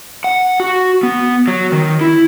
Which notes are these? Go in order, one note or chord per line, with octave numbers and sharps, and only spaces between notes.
F#5
F#4
B3
F#3
D#3
E4